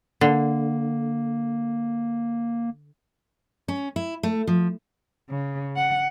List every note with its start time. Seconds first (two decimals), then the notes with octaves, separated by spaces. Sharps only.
0.21 D3 A#3
3.68 C#4
3.96 E4
4.23 A3
4.47 F3
5.29 C#3
5.76 F#5